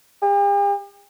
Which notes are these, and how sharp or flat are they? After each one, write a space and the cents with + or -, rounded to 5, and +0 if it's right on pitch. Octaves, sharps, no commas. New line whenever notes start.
G4 +45